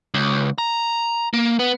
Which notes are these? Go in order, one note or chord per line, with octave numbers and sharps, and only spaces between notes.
C#2
A#5
A#3
B3